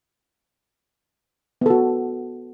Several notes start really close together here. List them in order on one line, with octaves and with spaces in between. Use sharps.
B3 A4 F#4